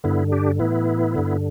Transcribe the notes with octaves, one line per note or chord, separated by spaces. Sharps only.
G2 D3 B3 E4
D4 G4
A2 E3 B3 E4
G2 D3